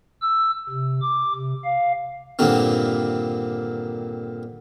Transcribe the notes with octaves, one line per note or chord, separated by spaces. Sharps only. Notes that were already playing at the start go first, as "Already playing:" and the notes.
E6
C3
D6
C3
F5
G2 A#2 D3 D#3 C4